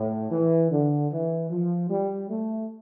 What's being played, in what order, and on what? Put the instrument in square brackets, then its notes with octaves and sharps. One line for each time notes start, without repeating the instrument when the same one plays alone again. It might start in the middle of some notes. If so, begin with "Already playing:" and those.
Already playing: [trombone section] A2
E3
D3
E3
F3
G3
A3